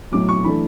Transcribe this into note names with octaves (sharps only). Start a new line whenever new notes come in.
B1 A2 F#3 D6
C#6
E3 A3 D4 B5